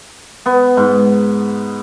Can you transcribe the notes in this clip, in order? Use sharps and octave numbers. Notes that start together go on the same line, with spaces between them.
B3
G#2